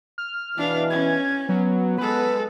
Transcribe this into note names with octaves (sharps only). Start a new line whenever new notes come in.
F6
E2 B2 E3 D4 F5
C#4 G#6
F#3 B3
G#3 A4 B4